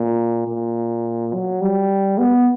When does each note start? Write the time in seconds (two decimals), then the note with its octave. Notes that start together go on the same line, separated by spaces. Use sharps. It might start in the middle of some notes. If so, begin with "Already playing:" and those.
Already playing: A#2
0.47 A#2
1.33 F#3
1.61 G3
2.18 B3